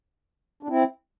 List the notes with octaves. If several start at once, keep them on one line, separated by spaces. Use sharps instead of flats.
D4
C4 E4